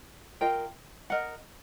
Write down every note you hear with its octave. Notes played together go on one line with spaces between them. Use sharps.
F4 A#4 D#5 G5
A#4 D#5 F#5